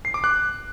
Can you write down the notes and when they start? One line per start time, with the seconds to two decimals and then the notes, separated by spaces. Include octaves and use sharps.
0.05 C7
0.14 D6
0.24 F#6